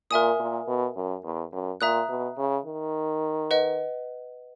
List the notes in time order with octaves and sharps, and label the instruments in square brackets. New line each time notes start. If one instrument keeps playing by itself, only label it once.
[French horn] A#2 [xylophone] A#4 E5 G#5 D#6
[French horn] A#2
B2
F#2
E2
F#2
[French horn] A#2 [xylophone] E5 A#5 D#6 F#6
[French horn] B2
C#3
D#3
[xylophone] B4 D#5 F#5